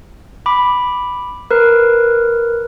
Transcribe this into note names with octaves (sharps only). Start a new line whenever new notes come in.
B5 D6
A#4 B4